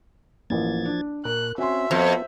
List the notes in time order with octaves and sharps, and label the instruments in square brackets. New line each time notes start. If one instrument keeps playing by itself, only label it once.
[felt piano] A1 A#3 [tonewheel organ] F3 G#6 A6
[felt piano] D4
[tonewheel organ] A#2 [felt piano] A#4 [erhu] F#6
[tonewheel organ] C4 C#4 [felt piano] F#4 G#5 C6 [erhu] E5
[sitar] F2 [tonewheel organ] B3 F4 C5